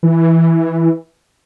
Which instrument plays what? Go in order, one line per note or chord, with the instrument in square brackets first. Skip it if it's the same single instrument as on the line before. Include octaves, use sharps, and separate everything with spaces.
[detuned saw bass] E3